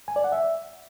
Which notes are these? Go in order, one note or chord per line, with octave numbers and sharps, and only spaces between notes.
G#5
D5
F#5
E5